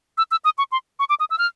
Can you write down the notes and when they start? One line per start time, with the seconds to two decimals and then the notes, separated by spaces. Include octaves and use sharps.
0.18 E6
0.31 E6
0.44 D#6
0.58 C#6
0.72 C6
0.99 C#6
1.09 D6
1.20 D#6
1.30 E6
1.38 F6